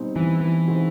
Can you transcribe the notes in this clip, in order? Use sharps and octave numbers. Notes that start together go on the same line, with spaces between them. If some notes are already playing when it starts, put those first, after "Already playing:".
Already playing: B2 G3 C4 D#4
E3
E3
B2 G#3 C4 D#4 F#4